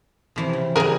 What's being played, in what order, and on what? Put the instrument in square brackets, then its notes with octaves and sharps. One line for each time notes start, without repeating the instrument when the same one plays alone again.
[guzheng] C3 E3 F3
C#3
[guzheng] C#3 E3 G3 [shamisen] G#4 A#4